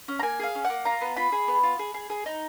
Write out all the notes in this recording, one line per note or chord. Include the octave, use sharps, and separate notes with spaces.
C#4
A#5
A#3 G#5
G#4 F5
C#4
A#3 F#5
F4 A#5
B3
F4 B5
G#4
B3
F4
G#4
G#4
G#4
D#4